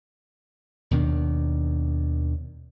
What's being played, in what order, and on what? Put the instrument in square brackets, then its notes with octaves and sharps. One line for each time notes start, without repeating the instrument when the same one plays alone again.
[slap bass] D#2 B2 D#3 D4